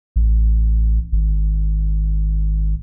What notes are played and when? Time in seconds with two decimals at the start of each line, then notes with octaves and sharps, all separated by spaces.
0.16 A1
1.12 G#1